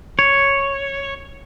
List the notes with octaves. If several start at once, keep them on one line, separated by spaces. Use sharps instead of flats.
C#5